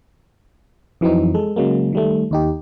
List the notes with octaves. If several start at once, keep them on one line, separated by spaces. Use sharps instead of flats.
F2 E3 F#3 C4 D#4
G#3 A4
C#3 F#3 G#3 A#3
D#3 G3 A3
D#2 D#4 G4